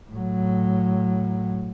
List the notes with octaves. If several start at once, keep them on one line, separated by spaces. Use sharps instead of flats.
A2 F#3